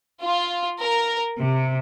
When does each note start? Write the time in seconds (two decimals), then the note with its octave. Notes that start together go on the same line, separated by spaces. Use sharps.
0.22 F4
0.81 A#4
1.38 C3